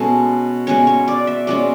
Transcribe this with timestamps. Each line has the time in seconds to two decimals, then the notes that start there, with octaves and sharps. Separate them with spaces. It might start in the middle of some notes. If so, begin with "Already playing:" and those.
Already playing: B2 G#3 C#4 A4
0.67 B2 G#3 C#4 C#5
0.87 C#5
1.08 D5
1.27 E5
1.47 B2 G#3 C#4 D5